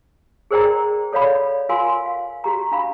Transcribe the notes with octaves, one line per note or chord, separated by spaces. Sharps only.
G#4 A#4 C5 D5 G5 A#5
A4 C#5 D5 F5 B5
F4 A#4 F5 G#5 C6
F5
F#4 G4 A#5
D4 F5 B5